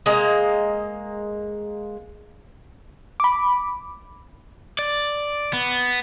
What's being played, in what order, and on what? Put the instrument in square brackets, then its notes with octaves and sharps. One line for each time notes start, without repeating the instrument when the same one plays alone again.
[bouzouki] G#3 A#3 D#5
[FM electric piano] B5 D6
[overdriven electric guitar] D5
B3